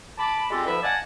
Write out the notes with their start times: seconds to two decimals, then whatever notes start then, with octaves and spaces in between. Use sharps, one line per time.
0.18 A5 B5 D6
0.51 G#3 C4 F4 G4 A4 D5
0.66 D2 F3 E4 B4 E5
0.82 D5 D#5 F5 F#5 G#5 A5